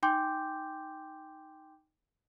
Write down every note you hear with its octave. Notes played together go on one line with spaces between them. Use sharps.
D#4 G5 G#5 C6 D6 G6